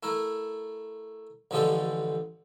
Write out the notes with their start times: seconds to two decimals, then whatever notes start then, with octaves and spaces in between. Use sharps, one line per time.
0.03 A3 E4 A#4
1.51 A1 D3 F3 G#3 G4 A4